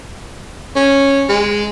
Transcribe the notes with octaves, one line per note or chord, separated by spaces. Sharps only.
C#4
G#3